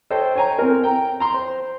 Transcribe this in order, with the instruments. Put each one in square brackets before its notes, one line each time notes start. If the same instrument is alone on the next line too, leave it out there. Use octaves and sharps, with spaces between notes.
[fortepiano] A4 C5 C#5 D#5 G5
C#5 G5 G#5 A#5
C4 A#4
G5 A#5
A#5 C6
C5